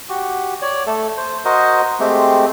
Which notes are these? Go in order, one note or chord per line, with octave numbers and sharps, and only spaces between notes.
F#4 G4
C#5 D5
A3 A4
C5
F#4 A#4 C5 D#5
G#3 A3 C4 G4